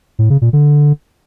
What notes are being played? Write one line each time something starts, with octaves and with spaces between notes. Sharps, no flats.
A2
C#3
A#2
D3